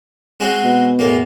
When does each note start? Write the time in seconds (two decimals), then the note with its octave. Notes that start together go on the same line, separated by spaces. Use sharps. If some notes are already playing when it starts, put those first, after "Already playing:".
0.40 G#3 C4 F#4
0.64 B2
0.99 E2 A2 A#3